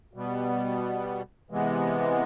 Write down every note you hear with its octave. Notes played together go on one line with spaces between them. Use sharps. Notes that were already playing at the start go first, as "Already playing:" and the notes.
B2 G3 B3
C3 E3 G#3 B3